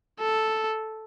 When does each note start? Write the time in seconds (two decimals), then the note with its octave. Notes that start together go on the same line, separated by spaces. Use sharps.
0.20 A4